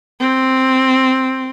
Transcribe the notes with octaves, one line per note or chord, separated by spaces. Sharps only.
C4